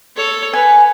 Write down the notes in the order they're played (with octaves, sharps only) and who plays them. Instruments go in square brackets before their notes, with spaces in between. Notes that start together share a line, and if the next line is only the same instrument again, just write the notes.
[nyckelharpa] A4 C#5
[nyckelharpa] B4 [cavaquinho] G#5